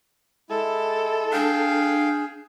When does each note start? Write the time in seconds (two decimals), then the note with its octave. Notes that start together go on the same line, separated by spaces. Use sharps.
0.50 G#3 E4 A4
1.33 D4 G#4 F5 G5